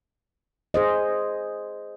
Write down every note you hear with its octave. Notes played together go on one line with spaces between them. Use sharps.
G#4 C5 D#5